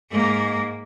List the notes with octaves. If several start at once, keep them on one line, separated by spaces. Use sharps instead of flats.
G#2 A#3